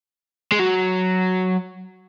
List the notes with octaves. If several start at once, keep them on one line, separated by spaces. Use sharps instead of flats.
G#3
F#3